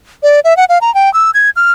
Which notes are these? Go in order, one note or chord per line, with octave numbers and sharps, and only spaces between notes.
D5
E5
F#5
F5
A#5
G5
E6
G#6
F6